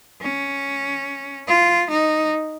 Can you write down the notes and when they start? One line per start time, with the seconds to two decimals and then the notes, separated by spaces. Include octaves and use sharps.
0.21 C#4
1.48 F4
1.90 D#4